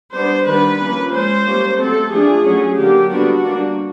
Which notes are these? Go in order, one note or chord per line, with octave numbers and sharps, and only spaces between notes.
G3 B3 D4 C5
D#3 G3 B3 D4 B4
F3 A#3 C#4
F3 G#3 C#4 C5
G3 A#3 C#4
F#3 A3 C4 A4
F3 A3 D4 G#4
F#3 A3 C#4
D3 F#3 A#3 G4
D3 G3 B3 D4 F#4
G3 A#3 D4